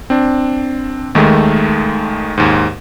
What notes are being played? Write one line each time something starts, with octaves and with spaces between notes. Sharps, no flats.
C4 D4
D#2 D#3 G#3 A3
D#2 G#2